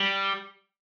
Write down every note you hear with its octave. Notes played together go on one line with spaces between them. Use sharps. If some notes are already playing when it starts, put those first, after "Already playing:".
Already playing: G3